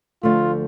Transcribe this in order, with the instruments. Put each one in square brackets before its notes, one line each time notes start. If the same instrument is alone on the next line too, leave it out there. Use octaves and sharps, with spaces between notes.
[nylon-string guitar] D2 D3 F3 A3 [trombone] F4